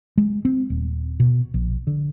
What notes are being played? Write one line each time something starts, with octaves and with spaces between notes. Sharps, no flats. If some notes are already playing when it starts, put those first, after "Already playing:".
G#3
C4
D#1
B2
A#1
D3